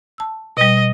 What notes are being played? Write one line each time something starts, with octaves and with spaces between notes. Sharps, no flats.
A5 E6
B2 G3 D#5